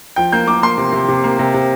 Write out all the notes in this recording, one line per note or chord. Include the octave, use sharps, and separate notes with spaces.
F3 G5
A#3 G6
A#3 D6
A#3 C6
C3
C3
C3
A#3
C3
C3